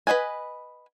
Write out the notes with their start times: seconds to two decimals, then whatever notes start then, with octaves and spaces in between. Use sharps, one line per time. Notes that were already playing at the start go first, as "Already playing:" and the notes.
0.07 B4 C5 D#5 F#5 G#5